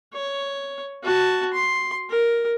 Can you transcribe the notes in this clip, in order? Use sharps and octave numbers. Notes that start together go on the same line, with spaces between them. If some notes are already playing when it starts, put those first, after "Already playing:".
C#5
F#4 A5
C6
A#4